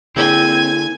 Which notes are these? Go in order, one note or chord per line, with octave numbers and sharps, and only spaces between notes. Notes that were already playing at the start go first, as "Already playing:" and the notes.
D3 A#3 C4 E4 G#4 G#5 G#6